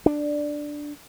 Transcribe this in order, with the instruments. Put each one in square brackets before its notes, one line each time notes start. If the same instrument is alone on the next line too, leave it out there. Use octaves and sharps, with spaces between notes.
[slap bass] D4